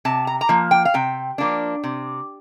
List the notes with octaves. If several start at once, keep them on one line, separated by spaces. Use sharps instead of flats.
C3 A5
A#5
A#5
F3 A#3
G5
F5
C3 G5
F3 A#3 D4
C3